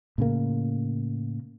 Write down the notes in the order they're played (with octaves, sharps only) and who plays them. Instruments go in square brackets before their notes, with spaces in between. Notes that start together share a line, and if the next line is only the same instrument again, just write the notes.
[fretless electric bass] A2 C#3 A#3